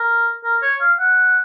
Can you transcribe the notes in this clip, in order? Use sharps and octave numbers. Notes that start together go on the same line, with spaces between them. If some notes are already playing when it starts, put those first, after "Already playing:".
Already playing: A#4
A#4
C#5
F5
F#5